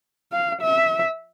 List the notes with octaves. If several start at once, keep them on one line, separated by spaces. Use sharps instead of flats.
F5
E5